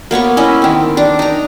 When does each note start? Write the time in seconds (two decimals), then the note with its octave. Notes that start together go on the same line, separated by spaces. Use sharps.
0.11 A#3 B3 C#5 C#6
0.37 C#4 E4 D#5
0.62 D#3 C4
0.97 D4
1.19 D#4 A#5